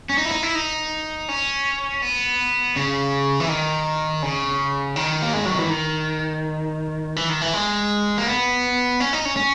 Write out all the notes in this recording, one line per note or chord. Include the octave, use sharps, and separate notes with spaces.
C#4
D#4
E4
D#4
E4
D#4
C#4
B3
C#3
E3
D#3
C#3
D#3
A#3
G#3
F#3
E3
D#3
E3
D#3
E3
G#3
A#3
B3
C#4
D#4
C#4
C#4